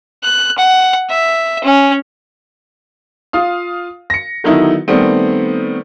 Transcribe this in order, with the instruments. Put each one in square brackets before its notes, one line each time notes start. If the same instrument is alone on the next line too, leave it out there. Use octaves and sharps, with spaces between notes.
[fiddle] F#6
F#5
E5
C#4
[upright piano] F4 F5 D#6
A#6 C#7
D3 D#3 F#3 B3 D#4 E4
D#3 G3 A3 B3 C4